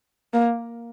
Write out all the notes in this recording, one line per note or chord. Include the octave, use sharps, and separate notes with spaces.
A#3